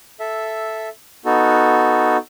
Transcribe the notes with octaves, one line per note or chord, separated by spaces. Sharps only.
A4 E5
B3 D#4 F#4 A4